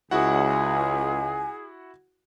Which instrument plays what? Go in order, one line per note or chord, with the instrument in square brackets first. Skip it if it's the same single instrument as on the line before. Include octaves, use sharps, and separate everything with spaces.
[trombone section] C#2 [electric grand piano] E4 F#4 F#5 [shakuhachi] G#4 [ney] G#5